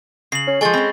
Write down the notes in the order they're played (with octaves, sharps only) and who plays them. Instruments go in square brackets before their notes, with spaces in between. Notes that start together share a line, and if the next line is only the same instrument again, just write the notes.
[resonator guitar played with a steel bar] C#3 [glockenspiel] C7 F#7
[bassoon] C#4
[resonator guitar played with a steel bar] F3 A4 [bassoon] G#3 [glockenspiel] G#5 C#6 A6
[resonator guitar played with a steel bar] C4 C#4 [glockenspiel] B5